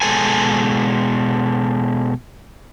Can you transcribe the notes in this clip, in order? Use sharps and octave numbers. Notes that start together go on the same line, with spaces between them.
B2 G#3 A4 G#5